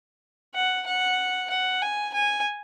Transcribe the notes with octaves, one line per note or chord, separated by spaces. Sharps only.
F#5
F#5
F#5
G#5
G#5